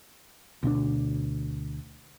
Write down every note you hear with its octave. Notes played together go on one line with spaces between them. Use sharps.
D2 B2 A3 D4